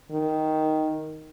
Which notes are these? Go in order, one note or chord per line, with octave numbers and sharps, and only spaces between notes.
D#3